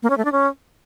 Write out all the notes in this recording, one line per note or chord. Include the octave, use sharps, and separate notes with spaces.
A#3
C#4
A3
D4
C#4